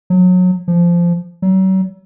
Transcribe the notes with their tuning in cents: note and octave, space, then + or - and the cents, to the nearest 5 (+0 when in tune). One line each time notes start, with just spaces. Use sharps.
F#3 -25
F3 -15
F#3 +40